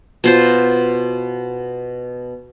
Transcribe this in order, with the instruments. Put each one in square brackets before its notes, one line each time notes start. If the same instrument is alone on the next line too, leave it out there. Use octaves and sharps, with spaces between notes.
[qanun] B2 F4 C5